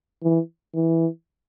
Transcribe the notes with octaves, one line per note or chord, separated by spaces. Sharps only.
E3
E3